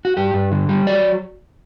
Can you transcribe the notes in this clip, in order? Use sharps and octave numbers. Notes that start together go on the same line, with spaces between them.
F#4
G2 G4
G2
D3
G3
F#3 D5